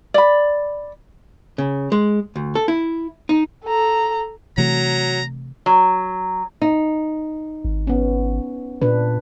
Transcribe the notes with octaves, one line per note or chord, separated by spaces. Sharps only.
D5 B5
C#3
G#3
D2
A4
E4
D#4
A4 A#5
C3 E3 F#3 A3 A#5
F#3
D#4
G#1
B3 C#4
A#2 D4 B4